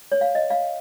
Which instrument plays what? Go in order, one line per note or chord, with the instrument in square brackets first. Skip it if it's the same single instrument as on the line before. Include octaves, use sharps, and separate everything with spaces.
[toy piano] C#5
F5
D#5
F5